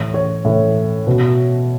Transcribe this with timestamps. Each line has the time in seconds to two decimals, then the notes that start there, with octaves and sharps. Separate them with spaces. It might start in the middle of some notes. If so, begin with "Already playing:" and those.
Already playing: A2 E3 C#5
0.14 C#5
0.45 A2 E3
1.07 B2